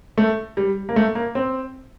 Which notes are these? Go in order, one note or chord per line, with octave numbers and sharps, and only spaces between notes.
A3
G3
A#3
A3
A#3
C4